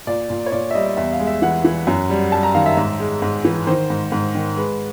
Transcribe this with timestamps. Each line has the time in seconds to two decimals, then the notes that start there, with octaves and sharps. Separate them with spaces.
0.07 A#2 D5
0.30 A#2
0.46 C#5
0.52 A#2 D5
0.71 E5
0.75 G3 D#5
0.89 D#5
0.97 E2 E5
1.13 F5
1.20 G#3
1.27 E5
1.42 E3 F#5
1.65 E3
1.87 F#2
2.10 G3
2.32 G3 A5
2.43 A#5
2.55 D#3 F5
2.66 E5
2.77 G#2 E5
3.00 G#3
3.22 G#2
3.45 E3
3.67 D#3 C5
3.90 G#2
4.12 G#2
4.35 D#3
4.57 G#3 B4